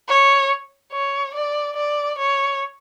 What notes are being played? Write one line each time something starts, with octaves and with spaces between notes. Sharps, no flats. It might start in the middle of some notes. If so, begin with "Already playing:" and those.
C#5
C#5
D5
D5
C#5